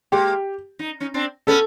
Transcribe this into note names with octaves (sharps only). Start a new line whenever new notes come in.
G#3 A#3 G4
D#4
C#4 D#4
C4 D4
B3 C#4 A4